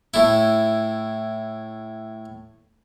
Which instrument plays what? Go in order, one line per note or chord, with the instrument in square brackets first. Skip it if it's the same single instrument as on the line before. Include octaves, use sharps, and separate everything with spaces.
[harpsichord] A2 E4